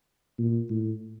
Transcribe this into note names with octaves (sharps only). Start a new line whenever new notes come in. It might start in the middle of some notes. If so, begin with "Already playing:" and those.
A#2
A2